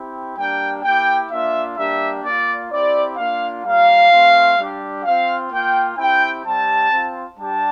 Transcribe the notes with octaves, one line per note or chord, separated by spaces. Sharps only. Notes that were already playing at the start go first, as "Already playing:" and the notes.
Already playing: C4 E4 G4
G3 A#3 D4 G4 G5
A#3 E4 G4 G5
A#3 D4 F4 E5
G3 A#3 D4 G4 E5
A#3 F4 D5
C4 E4 G4 D5
A#3 D4 F4 F5
G3 A#3 F4 F5
A3 C4 F4
G3 D4 G4
C4 F4 F5
A#3 F4 G5
C4 E4 G4 G5
G3 C4 G4 A5
C4 F4
G3 D4 G4 A5